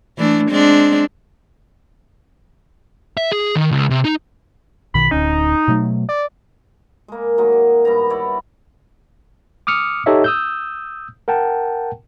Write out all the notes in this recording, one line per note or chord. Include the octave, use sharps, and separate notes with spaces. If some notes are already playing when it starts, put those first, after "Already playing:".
E3 A3 D4
G#3 C4 D4
E5
G#4
D#3
C#2
C3
D#4
B1 B2 D#3 B5
D1 D2 C#4 D#4
B2 F#3 A3
D5
G#3 A#3
D#3 F#3 G#3 A#3
G#3
G2 B3 A#5
E4 C#5 D5
D6 D#6 F6 C#7
D#4 G4 A4 C#5 D#5 E5
D#6 E6 G6
A#4 F#5 G5 A5